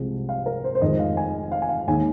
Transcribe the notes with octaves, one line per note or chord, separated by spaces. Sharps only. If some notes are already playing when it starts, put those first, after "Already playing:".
Already playing: C2 C3 F3 G#3
F5
A#4
C5
C5
F1 F2 D#3 G#3 D#5
F5
G#5
F5
G#5
F5
D#2 D#3 G#3 G#5